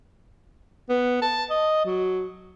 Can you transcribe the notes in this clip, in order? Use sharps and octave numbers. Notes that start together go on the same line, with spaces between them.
B3
A5
D#5
F#3